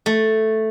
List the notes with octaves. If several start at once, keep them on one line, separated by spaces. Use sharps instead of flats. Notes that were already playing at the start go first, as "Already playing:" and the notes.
A3